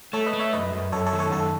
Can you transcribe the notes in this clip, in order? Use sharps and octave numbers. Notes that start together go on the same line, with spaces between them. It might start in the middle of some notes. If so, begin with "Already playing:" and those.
A3 A4 C#5
B4 D#5
A3
C#5 E5
F#2 B4 D#5
F#2
F#2 A4 C#5
A4 C#5
D#3
A4 C#5
F#2 A4